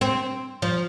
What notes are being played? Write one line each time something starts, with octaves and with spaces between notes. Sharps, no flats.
C4
F3